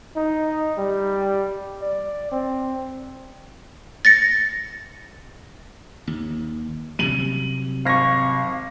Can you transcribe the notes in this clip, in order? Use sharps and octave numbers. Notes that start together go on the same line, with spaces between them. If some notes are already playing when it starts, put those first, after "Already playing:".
D#4
G3
D5
C4
A6 A#6 C#7
D#2
C3 F#3 G3 D#7 F#7
G#1 F5 C#6 A#6